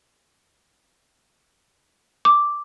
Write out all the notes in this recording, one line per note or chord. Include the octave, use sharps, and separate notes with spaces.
D6